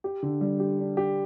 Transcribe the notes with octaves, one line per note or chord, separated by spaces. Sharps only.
G4
D3
G3
G4
D4
G4